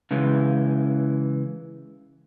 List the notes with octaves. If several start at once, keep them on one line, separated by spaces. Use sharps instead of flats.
C#3 E3 G#3